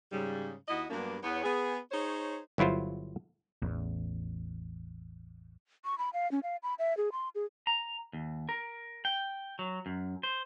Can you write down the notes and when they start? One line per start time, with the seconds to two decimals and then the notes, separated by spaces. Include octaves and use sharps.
0.11 G#2 C#3 G3
0.68 D#2 E4 F#4 D#5
0.90 G2 F#3 G3 A#3 B3 D4
1.22 E2 B3 C#5
1.44 B3 G#4
1.91 D#4 G#4 C5 C#5
2.58 G1 F#3 E4 F4 C5
3.62 A1 E2
5.85 C#6
5.98 B5
6.13 F5
6.32 C#4
6.43 F5
6.63 B5
6.79 E5
6.97 G#4
7.12 C6
7.35 G#4
7.67 A#5
8.13 D#2
8.49 A#4
9.05 G5
9.59 F#3
9.86 F#2
10.23 C5